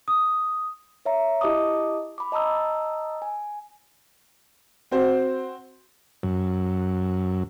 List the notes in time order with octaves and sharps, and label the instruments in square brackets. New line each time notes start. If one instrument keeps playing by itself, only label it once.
[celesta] D#6
[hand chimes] C#5 E5 A#5
E4 G4 D#5 A5 D6 D#6
B5 D6
D#5 A5 A#5 D#6 E6
G#5
[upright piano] C4 F#4 C5
[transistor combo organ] F#2